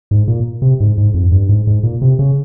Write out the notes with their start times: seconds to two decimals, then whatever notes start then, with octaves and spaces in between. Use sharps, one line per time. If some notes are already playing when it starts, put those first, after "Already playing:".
0.11 G#2
0.28 A#2
0.62 C3
0.80 G#2
0.98 G#2
1.14 F2
1.32 G2
1.49 G#2
1.67 G#2
1.83 A#2
2.02 C3
2.19 C#3